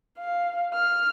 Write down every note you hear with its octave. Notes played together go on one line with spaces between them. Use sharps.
F5
F6